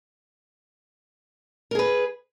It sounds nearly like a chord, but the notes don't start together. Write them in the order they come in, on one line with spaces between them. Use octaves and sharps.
A#4 G#4 B4